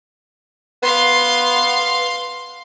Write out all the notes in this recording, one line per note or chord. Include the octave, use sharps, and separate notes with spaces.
B3 F5 C6